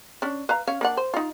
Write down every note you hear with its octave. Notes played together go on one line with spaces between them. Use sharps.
C#4 D4
B4 F5 A#5
C#4 C#5 F5
A#3 D4 F#5
C5
D#4 F4